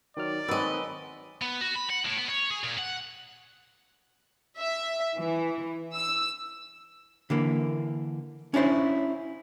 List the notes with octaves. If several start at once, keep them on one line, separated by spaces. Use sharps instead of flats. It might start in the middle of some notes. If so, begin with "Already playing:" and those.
D#3 F#3 D5 F6
D#3 F#3 G#3 C4 B4 D#5
B3
F#4
B5
F#5
A2
B3
C#5
G#4
A#2
F#5
E5
E3
E6
D3 E3 A#3
C#4 D4 E4 C5 C#5